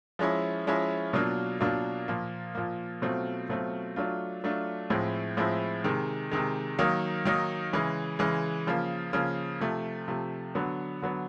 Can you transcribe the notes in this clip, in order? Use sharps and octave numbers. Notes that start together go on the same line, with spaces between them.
F3 G#3 C#4 E4
F3 G#3 C#4 E4
B2 F#3 A#3 D4 F4
B2 F#3 A#3 D4 F4
A#2 F3 A#3
A#2 F3 A#3
B2 F#3 A3 C4 F4
B2 F#3 A3 C4 F4
F#3 A3 D4 F4
F#3 A3 D4 F4
A2 F3 G#3 C4 E4
A2 F3 G#3 C4 E4
C3 D#3 G#3
C3 D#3 G#3
D#3 F#3 A#3 D#4
D#3 F#3 A#3 D#4
C#3 E3 G#3
C#3 E3 G#3
C#3 F3 A#3
C#3 F3 A#3
C3 F3 A3
C3 F3 A3
D3 F#3 B3
D3 F#3 B3